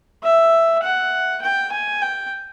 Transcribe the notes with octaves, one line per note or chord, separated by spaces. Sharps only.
E5
F#5
G5
G#5
G5